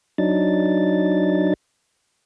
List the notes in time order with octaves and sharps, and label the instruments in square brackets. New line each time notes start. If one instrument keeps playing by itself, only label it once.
[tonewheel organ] F#3 D4 D#4 A6